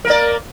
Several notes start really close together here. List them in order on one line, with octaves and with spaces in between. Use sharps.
A#4 A#3 D5